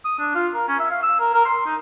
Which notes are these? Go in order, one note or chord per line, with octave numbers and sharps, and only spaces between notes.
D#6
D4
F4
A#4
C#4
E5
F5
E6
A#4
A#4
C6
D#4